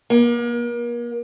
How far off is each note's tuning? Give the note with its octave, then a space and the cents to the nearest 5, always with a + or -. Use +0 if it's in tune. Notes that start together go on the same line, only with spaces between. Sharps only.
A#3 +40